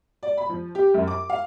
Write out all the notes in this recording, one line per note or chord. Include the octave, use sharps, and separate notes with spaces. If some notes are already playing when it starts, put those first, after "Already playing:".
D5
B5
F3
G4
F#2
D6
F5